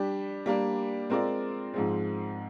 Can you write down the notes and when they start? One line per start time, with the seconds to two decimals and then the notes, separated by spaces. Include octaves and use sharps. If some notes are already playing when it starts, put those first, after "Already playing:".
Already playing: G3 D4 G4
0.46 G3 A#3 D4
1.10 G#3 C4 F4 A#4 D5
1.74 G#2 F3 G#3 C4